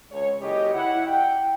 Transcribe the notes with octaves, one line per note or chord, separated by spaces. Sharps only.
C#2 C#5
F#1 C#3 G4 C#5 D#5
E4 F#5
G5